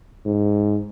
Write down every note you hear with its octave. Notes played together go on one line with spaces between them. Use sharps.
G#2